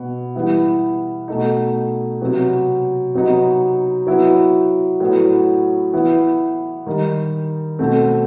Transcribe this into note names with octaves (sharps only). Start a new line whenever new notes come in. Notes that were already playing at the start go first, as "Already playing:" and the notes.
Already playing: B2 B3
E3 G3 B3 E4
B2 A3 D#4
C3 F#3 B3
C3 F#3 B3 D#4
F#3 B3 E4
A2 F#3 B3
E3 B3 E4
D#3 G3 D#4
B2 A3 C4